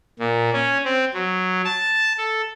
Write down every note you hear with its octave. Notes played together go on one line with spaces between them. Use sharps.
A#2
C#4
C4
F#3
A5
A4